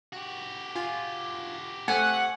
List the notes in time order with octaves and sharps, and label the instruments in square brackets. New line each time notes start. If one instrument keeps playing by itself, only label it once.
[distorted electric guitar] F#4 G4
[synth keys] F4 G#5
[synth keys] A3 C4 [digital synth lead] F#5 [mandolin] G#5